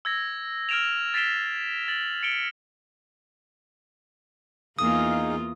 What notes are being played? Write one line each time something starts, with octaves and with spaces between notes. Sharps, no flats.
E6 G#6 A#6
F6 G#6 D7 E7 F7
A6 B6 C7 D7 E7 G7
A6 F#7
C#7 D7 G7
E2 A#3 D#4 F4 G#4 F5 D#6